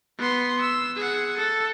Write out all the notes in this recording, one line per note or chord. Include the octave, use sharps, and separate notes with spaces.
B3 C6
E6
G#4 F#5
A4